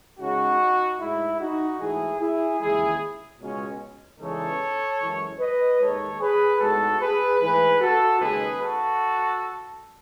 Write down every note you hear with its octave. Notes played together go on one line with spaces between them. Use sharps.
C#3 G#3 C#4 D#4 F#4
A2 G#3 D#4 E4
D#4 F#4
G#2 E3 A3 E4 G#4
E4 G#4
D#2 C#3 E3 G#3 E4 G#4
C#2 B2 G#3 C#4
E2 C#3 E3 G#3 D#4 A4 C#5
F#2 E3 G#3 C#4
B4 D#5
D#2 D#3 G#3 D#4 A4 C#5
G#4 B4
A2 G#3 B3 D#4 F#4 A4
G#4 B4
G#2 E3 A3 G#4 B4
F#4 A4
D#2 C#3 G#3 D#4 G#4 B4
F#4 A4